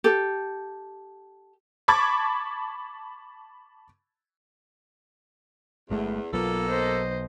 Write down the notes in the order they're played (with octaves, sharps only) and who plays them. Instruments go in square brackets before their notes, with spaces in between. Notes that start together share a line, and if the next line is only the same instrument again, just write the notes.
[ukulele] G4 A4
[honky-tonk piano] A5 B5 C#6 D6 G#6 A6
[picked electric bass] G1 G#3 A3 [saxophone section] E2
[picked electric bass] B1 F#3 B3 [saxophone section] A#3 A4 [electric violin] F4
[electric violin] C5 D#5